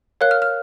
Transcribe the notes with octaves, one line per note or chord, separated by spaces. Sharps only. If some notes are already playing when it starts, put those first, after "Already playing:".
A#4 C#5 F5 F#6
F6
F6